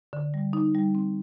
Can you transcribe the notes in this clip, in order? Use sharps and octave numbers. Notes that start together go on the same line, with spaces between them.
D3
G3
D#4
G3
C4